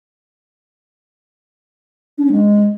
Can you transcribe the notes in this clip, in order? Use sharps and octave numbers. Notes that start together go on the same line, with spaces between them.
D4
C#4
G#3